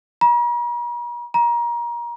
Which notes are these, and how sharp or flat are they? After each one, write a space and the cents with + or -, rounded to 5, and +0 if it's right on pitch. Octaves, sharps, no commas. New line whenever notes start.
A#5 +45
A#5 +25